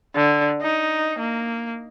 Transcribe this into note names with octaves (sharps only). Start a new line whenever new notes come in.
D3
D#4
A#3